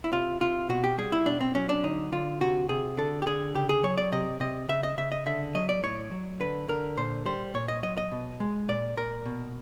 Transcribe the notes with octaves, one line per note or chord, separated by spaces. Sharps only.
E4
C3 F4
C3 F4
B2 F#4
G4
G3 G#4
E4
B2 D4
C4
F#3 C#4
D4
D3 D#4
D3 F4
C3 F#4
C3 G#4
D3 A4
G4
D3 G#4
C#3 G4
G#4
F#3 C#5
D5
C3 D#5
C3 D#5
C#3 E5
D#5
C#3 E5
D#5
D3 E5
F#3 D#5
D5
A2 C#5
F#3
D3 B4
D3 A#4
A#2 C5
G3 C5
A#2 C#5
D#5
F#3 D#5
D#5
B2
G#3
A#2 D5
A#2 A#4
B2